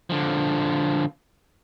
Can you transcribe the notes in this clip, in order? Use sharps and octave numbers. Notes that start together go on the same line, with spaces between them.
D3 F3